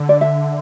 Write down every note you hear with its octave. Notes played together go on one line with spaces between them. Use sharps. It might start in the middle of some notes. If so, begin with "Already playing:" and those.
Already playing: D3
D5
E5